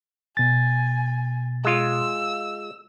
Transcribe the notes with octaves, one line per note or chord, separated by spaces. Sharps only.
B2 G#5 A6
G#3 F4 E6